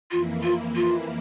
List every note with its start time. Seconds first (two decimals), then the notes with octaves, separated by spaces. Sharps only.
0.11 F2 E3 A#3 E4 F4
0.43 F4
0.75 F4